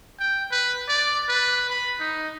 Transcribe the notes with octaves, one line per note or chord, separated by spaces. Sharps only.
G5
B4
D5
B4
B5
D#4